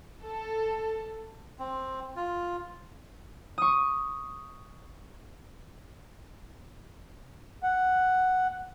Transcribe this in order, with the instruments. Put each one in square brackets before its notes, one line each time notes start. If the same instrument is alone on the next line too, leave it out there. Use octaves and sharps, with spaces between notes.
[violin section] A4
[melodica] C4
F4
[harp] C#6 D#6
[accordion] F#5